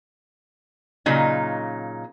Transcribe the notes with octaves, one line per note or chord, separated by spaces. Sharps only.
A#2 C#3 F#3 D#4